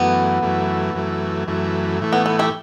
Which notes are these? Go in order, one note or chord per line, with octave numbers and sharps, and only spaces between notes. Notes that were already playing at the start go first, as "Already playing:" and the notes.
Already playing: F#2 E3 A3 B3
F#2 E3 A3
F#2 E3 A3
F#2 E3 A3
A2 E3 A3
B3
B3
E4 G4